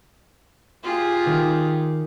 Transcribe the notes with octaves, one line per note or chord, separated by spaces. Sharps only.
F4 G4 G#4
D#3